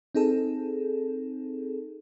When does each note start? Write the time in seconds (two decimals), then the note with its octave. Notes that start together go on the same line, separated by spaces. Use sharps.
0.15 C4 D#4 G#4 A4